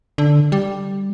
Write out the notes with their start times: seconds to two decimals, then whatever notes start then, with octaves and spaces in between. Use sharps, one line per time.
0.18 D3
0.52 G3